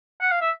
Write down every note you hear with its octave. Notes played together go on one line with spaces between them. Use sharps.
F#5
F5
E5